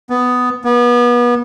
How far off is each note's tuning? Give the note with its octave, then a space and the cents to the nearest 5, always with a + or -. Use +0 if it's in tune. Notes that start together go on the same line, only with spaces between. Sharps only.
B3 +10
B3 -30